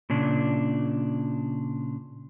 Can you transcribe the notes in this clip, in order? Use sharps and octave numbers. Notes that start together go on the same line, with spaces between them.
A#2 C#3 D4